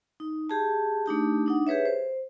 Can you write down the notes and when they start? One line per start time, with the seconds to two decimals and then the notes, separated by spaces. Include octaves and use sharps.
0.20 D#4
0.50 G4 G#4 A5
1.06 A3 D4 D#4 G4
1.46 D4 D#4 F#5
1.67 G4 G#4 B4 C#5 E5
1.85 C5